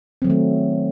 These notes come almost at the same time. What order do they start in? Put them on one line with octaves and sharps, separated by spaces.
C4 F#3 D#3 A3